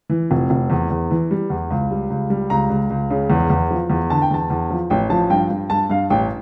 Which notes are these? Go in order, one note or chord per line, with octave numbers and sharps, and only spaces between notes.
E3
F1
F1
E2
E2
E3
G3
E2
C#2
G3
C#2
G3
C#2 A#5
C#2
C#2
C#3
E2
E2
F3
E2
D3 A5
G5
E2 A5
E2
F3
A1 G5
F3 A5
G2 G5
G2
G2 A5
G2 F5
A1 G5